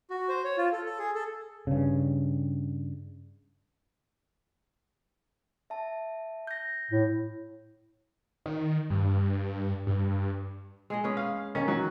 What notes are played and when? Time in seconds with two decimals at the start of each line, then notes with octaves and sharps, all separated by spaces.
0.10 F#4
0.29 C5
0.44 C#5
0.57 F4
0.72 A4
0.86 A4
0.99 G#4
1.15 A4
1.67 G2 C#3
5.70 E5 A5
6.47 G6 A#6
6.91 A2
8.46 D#3
8.90 G2
9.87 G2
10.90 G#3 G#4 D#5
11.04 C#4 G#4 B4
11.17 F5
11.55 D#3 C#4
11.68 F#3